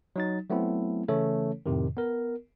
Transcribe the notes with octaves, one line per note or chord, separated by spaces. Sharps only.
F#3 D#4 A6
F#3 A3 B3 C4 E4
C#3 E3 A3 C#4 A4 C#5
F2 A2 C3 D#3
B3 A#4